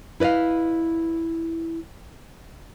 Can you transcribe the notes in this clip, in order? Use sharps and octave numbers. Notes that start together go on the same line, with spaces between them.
E4 B4 D5 D#5 F5